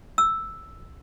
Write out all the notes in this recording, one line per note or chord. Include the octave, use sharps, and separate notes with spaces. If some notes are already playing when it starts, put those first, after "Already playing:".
E6